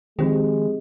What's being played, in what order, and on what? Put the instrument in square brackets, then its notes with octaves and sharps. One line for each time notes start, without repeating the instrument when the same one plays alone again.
[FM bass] D#3 [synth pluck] F3 C4 G4 [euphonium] G#3